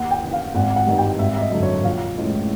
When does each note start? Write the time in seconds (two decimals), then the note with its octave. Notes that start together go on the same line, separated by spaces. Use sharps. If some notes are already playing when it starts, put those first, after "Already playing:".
Already playing: D#2 F#5
0.11 G5
0.22 C#3 E3
0.33 F5
0.55 G#1 F#5
0.76 F#5
0.86 G2 D#3 G3
0.98 G5
1.19 G#1 E5
1.36 E5
1.41 D#5
1.52 F#2 D3
1.63 C#5
1.84 A#1 F5
2.17 A2 E3 G#3 C#4